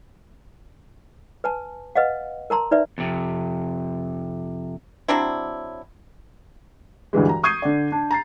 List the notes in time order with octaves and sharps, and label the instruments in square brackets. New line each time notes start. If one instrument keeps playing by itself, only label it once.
[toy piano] B4 G#5 A5
B4 D#5 F5 F#5
A#4 A5 A#5 C6
D#4 B4 D5 E5
[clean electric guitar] F2 C3
[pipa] F#3 C4 D4 E4
[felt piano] D2 G2 E3 G#3
A#5
C#6 D#6 G6 G#6 C7 D#7
D3 D5
D4
A#5 A6 C7